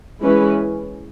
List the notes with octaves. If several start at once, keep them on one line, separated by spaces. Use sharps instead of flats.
E3 G#3 C#4 E4 B4